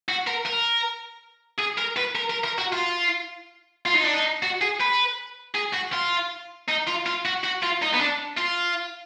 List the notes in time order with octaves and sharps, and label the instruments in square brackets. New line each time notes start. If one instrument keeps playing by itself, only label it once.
[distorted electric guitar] F#4
A#4
A#4
G#4
A#4
B4
A#4
A#4
A#4
F#4
F4
F4
D#4
D4
D#4
F#4
G#4
B4
G#4
F#4
F4
D#4
F4
F4
F#4
F#4
F4
D#4
B3
D4
F4